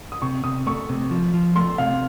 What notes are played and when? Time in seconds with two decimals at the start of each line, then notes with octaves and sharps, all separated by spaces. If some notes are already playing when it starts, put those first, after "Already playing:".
0.12 D#6
0.22 C3 C#6
0.44 C3 D#6
0.67 A3 C#6
0.89 C3
1.11 F3
1.34 F3
1.56 A3 C6
1.78 C3 F5